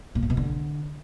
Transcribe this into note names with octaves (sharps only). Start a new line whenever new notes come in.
A#2
A2
B2
D3